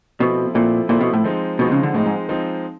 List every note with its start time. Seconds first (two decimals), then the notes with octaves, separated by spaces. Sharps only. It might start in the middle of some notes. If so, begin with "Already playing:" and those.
0.19 B2 F3 A3 C4 E4
0.55 A#2 F3 A3 C4 E4
0.89 A#2 F3 A3 C4 E4
1.01 B2
1.13 A2
1.24 F3 G#3 C4 D#4
1.59 B2 F3 G#3 C4 D#4
1.72 C#3
1.83 D3
1.94 A2 F3 G#3 C4 D#4
2.06 G#2
2.29 F3 G#3 C4 D#4